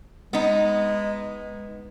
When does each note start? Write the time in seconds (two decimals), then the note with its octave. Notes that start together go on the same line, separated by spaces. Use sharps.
0.33 G#3 B3 D#4